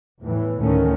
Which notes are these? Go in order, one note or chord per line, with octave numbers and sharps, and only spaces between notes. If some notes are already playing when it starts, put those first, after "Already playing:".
E2 A2 E3
D2 A2 D#3 A3 C#4